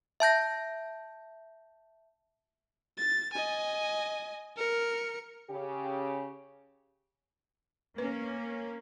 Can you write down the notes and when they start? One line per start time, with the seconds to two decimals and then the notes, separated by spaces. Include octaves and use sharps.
0.20 E5 A5 G6 A#6
2.98 A6
3.33 D#5 G#5
4.57 A#4 C#7
5.49 C#3 G4
7.98 A#3 C#4 B4